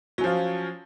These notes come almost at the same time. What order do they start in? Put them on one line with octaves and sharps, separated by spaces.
F#3 C#4 F3 F4